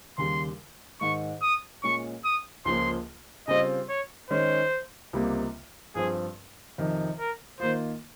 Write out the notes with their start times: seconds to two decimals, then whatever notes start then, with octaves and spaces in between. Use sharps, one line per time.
0.18 D#2 C#3 G3 C6
1.01 G#2 D#3 G#3 C#6
1.42 D#6
1.84 A#2 G#3 C#4 C#6
2.24 D#6
2.65 C#2 C#3 F3 A#3 C6
3.48 C#3 G3 C4 F4 D#5
3.89 C#5
4.31 D#3 G#3 C#4 C5
5.13 C#2 C3 G3 A#3
5.95 G2 F3 C4 G#4
6.78 F2 C3 D#3
7.19 A#4
7.60 D#3 A#3 F4 C5